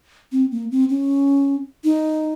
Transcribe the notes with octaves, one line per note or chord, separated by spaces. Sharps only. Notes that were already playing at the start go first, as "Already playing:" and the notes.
C4
A#3
C4
C#4
D#4